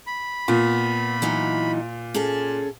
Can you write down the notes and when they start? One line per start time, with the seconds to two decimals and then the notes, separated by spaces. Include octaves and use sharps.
0.07 B5
0.48 A#2 B3
1.22 E3 F#3 D#4
2.14 C#4 G#4 A4